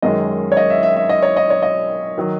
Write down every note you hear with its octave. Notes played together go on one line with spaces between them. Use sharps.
F#2 D#3 G#3 C#4 D#5
C#5
D#5
E5
E5
E5
D#5
C#5
D#5
C#5
D#5
D#3 F#3